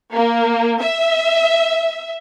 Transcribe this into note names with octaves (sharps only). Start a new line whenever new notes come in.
A#3
E5